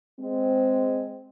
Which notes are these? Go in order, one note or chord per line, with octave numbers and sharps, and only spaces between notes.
G#3 C4